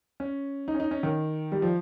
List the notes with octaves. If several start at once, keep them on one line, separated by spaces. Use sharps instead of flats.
C#4
D#4
C#4
D#4
C#4
D#3
G3
F3